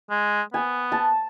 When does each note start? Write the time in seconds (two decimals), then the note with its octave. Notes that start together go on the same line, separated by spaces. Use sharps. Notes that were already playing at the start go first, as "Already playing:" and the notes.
0.10 G#3
0.54 B3 G#5
0.92 A5